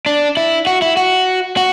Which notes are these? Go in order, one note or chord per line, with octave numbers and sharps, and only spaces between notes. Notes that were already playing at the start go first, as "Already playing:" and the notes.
D4
E4
F#4
E4
F#4
F#4